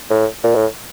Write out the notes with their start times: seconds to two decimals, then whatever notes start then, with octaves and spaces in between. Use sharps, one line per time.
0.10 A2
0.44 A#2
0.56 A2